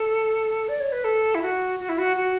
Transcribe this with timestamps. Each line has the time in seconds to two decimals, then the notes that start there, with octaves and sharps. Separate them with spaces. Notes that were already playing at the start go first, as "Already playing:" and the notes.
Already playing: A4
0.68 D5
0.80 C#5
0.92 B4
1.04 A4
1.35 E4
1.42 F#4
1.80 F#4
1.89 E4
1.99 F#4
2.17 F#4